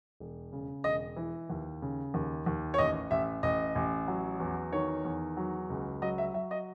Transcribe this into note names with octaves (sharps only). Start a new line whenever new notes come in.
E1
C#3
E1 D#5
E3
D#2
C#3
D#2
D#2
C#5
A1 D#5
A1 E5
A1 D#5
A1
F#3
E2
D#3 C#5
E2
F#3
C#2
F#3 D#5
E5
F#3 E5
D#5